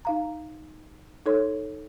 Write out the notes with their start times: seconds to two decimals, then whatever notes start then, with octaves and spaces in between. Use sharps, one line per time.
0.05 D#4 F5 A#5
1.26 D#4 A4 C#5 C6